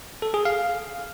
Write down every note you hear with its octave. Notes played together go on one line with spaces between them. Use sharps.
A4
G#4
F5